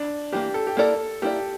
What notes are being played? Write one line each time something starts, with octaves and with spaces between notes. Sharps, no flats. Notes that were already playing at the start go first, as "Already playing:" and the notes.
Already playing: D4
E3 G3 A#3 G4
A4
G4
A#3 E4 A4 A#4 D5
A#3 E4 G4 A#4 D5